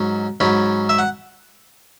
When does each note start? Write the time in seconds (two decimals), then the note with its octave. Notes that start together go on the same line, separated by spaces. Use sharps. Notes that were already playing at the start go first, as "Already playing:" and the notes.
Already playing: G#2 F#3 C#4
0.40 G#2 F#3 C#4 B5
0.89 E5
0.99 F#5